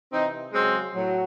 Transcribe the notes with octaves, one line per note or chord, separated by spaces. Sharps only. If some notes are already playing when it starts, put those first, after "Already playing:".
C3 E3 C4 D#4
C#3 F#3 G#3 C4
A2 F#3